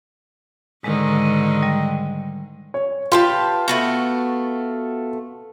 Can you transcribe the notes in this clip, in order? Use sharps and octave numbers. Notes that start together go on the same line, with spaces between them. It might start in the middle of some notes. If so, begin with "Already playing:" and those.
G#2 D3 D#3 G#3
G3
C#5
F4 G4 B4 A5 C6
A3 B3 F#4